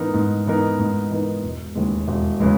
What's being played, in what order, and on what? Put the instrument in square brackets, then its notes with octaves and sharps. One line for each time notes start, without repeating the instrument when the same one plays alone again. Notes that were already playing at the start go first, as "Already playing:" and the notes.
Already playing: [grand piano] G#2 E3 B3 D#4 A#4
G#2
E3 B3 D#4 A#4
G#2
E3 B3 D#4 A#4
E1
D#2 C#3 E3 G#3
E1
C#3 E3 G#3